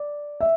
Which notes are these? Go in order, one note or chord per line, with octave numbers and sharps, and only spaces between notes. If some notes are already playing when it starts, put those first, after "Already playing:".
Already playing: D5
E5